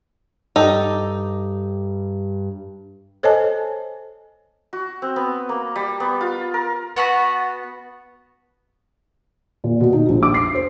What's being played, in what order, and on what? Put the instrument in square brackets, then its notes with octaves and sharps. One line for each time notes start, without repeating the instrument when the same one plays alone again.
[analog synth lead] G2 [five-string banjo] D#4 G4 A4
[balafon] A4 C5 C#5 D#5 G#5 A5
[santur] F#4
C4
B3
A#3
G3
B3
F4
A#4
[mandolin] B3 F#4 A5 B5
[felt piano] A#2
B2
D#4
A#1
D6
C7
C5